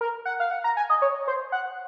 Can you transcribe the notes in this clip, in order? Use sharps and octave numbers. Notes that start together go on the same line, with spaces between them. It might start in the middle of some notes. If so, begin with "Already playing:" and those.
A#4
F#5
F5
F#5
A#5
G#5
D#5
C#5
C5
F#5